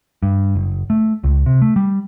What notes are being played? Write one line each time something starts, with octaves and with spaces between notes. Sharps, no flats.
G2
F#1
A3
C#2
C3
A3
G3